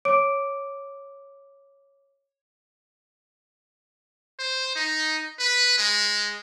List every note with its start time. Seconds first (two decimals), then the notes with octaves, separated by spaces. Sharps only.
0.05 C#5 D6 D7
4.39 C5
4.76 D#4
5.39 B4
5.78 G#3